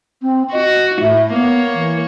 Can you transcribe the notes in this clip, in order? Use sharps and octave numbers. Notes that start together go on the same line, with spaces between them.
C4
F#4 D#5
A2 E5
A#3 B3 C#5
E3